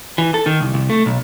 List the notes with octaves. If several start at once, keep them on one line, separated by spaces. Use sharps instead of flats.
E3
A4
D#3
C2
C2
A3
B1